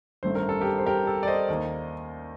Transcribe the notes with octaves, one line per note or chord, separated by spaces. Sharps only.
A1 G2 D#3 A3 C4 C5
A#4
A4
G4 A#4
C5
G4 A#4
A4
D5
C5 D#5
D#2 D#3 A#3